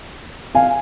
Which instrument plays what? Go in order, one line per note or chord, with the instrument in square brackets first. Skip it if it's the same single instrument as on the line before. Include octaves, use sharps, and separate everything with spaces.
[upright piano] F5 G#5